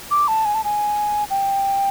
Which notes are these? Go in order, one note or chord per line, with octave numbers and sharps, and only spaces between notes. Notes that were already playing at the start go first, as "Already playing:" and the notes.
D6
A5
G#5
A5
G#5
G5